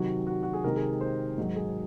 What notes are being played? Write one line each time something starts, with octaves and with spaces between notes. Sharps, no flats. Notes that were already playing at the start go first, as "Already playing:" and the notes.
Already playing: C3 D#3 F#3 F#4
F#4
F#4
G#4
C3 D#3 G#3 A#4
G#4
C5
G#2 D#3 F#3 F#4
G#4